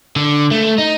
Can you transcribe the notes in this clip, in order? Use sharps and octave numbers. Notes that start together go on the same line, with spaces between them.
D3
A3
D#4